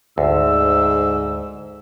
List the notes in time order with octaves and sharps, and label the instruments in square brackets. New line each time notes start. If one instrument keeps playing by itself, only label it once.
[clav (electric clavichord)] D2 [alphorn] G#2 [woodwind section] E6